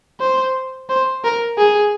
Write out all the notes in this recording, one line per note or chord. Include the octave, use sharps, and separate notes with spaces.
C5
C5
A#4
G#4